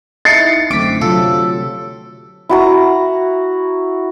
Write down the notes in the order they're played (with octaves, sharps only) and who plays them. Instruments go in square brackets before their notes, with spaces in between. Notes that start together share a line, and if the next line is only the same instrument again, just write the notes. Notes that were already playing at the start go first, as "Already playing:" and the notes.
[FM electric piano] D#4 E4 [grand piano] A6 C7 C#7
[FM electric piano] F#2 B6 [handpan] D3 A3 C4 [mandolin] D6
[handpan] C3 F#3 [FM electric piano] F4 [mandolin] A4
[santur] E4 F#4 A#5